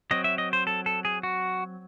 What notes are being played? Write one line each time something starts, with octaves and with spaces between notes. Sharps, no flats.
F#3 C4 D#5
E5
D#5
C5
A4
A4
G#4
F#4